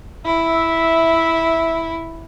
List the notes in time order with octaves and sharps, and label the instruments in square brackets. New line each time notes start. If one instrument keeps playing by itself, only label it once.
[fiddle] E4 [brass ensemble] E5